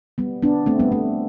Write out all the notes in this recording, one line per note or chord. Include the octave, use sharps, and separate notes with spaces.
G3 B3
B3 D4
A3 C4
G3 B3
A3